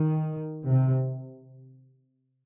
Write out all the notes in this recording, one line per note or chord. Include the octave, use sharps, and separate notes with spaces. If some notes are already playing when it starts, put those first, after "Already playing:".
Already playing: D#3
C3